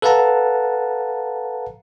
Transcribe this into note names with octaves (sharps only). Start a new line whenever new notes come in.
A4 B4 F5 F#5 A5 A#5